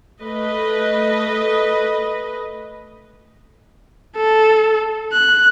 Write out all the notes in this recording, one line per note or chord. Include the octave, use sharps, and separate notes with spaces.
A3 B4 D#5
A4
F#6